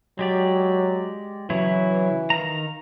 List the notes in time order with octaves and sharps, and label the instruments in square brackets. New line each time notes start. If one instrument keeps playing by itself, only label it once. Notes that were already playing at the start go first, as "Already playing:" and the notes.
[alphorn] F#3 [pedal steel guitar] G#3 G4 D5
[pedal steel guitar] C#3 F#3 E4 [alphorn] E3
[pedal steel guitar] D#3 F5 A#5